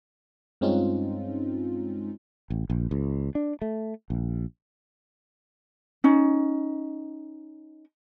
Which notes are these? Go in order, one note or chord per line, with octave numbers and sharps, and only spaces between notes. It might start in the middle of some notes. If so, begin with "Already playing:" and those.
G2 G#3 C4 C#4 D#4 F4
A1
A#1
C#2
D4
A3
A#1
C#4 D#4